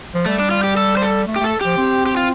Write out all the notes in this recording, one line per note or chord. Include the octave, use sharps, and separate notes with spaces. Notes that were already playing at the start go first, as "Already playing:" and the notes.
F3
G3 A3
D4
F4
G4
A4
C5
A4
A3
G4
A3 A4
F3 G4
C4
G4
F4